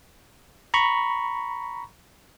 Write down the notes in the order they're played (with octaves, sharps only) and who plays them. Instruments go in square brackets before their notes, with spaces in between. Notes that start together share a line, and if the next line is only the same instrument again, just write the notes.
[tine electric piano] A#5 B5 C#6